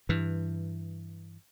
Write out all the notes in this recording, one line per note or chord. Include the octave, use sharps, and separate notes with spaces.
G2 E3